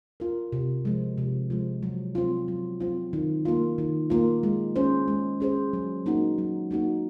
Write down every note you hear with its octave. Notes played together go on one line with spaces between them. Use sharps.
F4 A#4
C3
F3 G#3
C3
F3 G#3
F#3
C4 F4
F#3
C4 F4
D#3
A#3 F4
D#3
A#3 F4
G#3
C#4 G#4 C5
G#3
C#4 G#4 C5
F#3
A#3 D#4 F#4
F#3
A#3 D#4 F#4